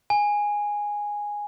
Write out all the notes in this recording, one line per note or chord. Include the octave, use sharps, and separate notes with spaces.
G#5